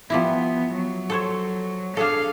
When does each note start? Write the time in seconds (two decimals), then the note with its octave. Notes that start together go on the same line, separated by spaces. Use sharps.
0.10 F3 G3 B3 E4
0.74 F#3
1.10 A4 C5 C#5
1.97 D4 G#4 A4 F5